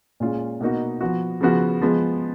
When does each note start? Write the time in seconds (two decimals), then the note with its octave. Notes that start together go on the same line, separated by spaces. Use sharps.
0.20 A#2 G#3 C#4 F4 G#4
0.61 B2 A#3 D#4 F#4
1.01 F3 B3 F#4
1.41 C#3 F3 B3 F#4
1.82 F3 G#3 B3